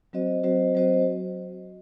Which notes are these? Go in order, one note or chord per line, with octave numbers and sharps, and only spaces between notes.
F#3 C4 F#4 C5 D#5
F#3 C4 F#4 C5 D#5
F#3 C4 F#4 C5 D#5